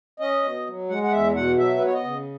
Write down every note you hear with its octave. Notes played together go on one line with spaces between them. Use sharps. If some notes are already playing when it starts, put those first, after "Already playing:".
C#4 D#5
B2
F#3
G#3 F#5
F#5
E2 E5
B2 F#5
F#3 E5
B4
B3 C#5
D#5
C#3